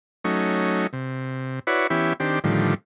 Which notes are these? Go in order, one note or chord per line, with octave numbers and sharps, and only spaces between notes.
F#3 A3 C#4 D#4
C3
E4 F#4 B4 C#5 D5
E3 B3 C#4 E4 G4
D#3 C4 D4 G4
A2 D3 D#3 F3 G3